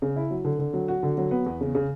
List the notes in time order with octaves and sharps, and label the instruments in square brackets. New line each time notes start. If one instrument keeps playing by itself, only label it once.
[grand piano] C#3
E4
F#3
D3
D3
F#3
F#4
D3
F#3
B3
E2
C#3
C#3